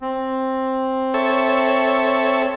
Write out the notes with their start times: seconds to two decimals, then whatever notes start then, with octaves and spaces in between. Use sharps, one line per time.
0.01 C4
1.14 A4 C#5 E5